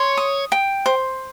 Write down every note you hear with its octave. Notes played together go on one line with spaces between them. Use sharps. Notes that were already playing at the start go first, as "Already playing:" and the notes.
Already playing: C#5 C6
D#6
G5
C5